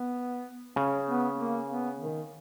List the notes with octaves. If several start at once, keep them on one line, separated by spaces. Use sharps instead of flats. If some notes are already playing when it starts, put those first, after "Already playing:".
Already playing: B3
C#3 C#4
B3
A#3
B3
D#3